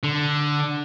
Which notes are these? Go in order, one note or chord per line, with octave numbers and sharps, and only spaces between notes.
D3